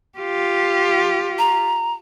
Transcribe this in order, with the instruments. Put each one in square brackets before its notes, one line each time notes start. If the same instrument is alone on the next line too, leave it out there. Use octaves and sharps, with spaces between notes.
[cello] F4 G4
[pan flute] A#5